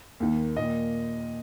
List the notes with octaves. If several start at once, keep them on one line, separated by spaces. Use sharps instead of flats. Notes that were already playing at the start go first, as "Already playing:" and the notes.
D#2 D#3
A#2 D#5